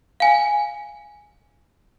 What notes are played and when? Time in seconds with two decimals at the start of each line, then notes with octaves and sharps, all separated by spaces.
0.20 F5 G#5